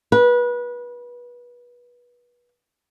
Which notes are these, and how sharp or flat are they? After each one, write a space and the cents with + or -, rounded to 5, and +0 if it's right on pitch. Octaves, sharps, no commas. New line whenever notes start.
B4 -25